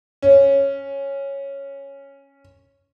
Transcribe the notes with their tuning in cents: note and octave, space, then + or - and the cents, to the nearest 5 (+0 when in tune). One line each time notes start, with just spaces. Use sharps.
C#4 -5